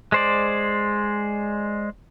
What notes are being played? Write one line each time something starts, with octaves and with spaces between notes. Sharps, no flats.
G#3 C5 D5